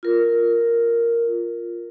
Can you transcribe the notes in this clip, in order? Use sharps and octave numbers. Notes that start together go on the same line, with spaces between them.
F4 A#4